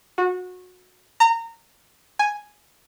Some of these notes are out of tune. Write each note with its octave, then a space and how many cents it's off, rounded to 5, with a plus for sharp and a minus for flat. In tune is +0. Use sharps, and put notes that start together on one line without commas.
F#4 -25
A#5 -25
G#5 +0